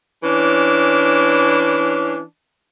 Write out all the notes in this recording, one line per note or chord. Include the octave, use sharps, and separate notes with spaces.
E3 C#4 D4